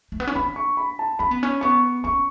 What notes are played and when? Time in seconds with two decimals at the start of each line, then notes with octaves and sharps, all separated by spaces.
0.12 A3
0.20 B3
0.28 C#4
0.35 D4 B5
0.56 C#6
0.77 B5
0.99 A5
1.19 C#4 B5
1.31 B3
1.43 C#4
1.61 B3 C#6
2.04 C#4 C#6